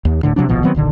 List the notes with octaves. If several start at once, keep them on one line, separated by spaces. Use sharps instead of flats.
D#2
D1 A2 D3
C3 E3 F#3 D4
D1 A#1 B2 F3
D#3 F#3 B3 C4
D1 A#1 D3 D#3